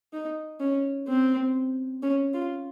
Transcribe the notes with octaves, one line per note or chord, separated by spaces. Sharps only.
D#4
C#4
C4
C#4
F4